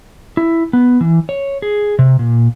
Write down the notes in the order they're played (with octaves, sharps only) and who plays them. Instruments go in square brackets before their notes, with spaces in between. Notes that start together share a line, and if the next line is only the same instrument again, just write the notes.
[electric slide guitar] E4
B3
E3
C#5
G#4
C3
A#2